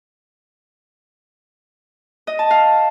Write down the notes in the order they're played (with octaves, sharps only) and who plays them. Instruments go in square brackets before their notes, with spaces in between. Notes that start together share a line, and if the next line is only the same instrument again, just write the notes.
[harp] D#5
A5
F5